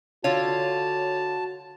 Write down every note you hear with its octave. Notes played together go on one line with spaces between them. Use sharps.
D3 F4 F#4 C#5 A5